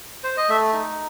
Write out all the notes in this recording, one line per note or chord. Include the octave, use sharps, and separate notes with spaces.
C5
D#5
A3 E5
D#4